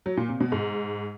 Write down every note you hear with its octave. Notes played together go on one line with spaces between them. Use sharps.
F#3
A#2
C3
B2
G#2